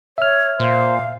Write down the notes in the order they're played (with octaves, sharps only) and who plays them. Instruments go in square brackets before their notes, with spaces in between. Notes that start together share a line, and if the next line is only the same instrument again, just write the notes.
[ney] C#5 [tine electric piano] E5 F6
[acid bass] A#2 [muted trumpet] C5 [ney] F5